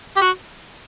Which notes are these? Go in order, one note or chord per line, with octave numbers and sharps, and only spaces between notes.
G4
F#4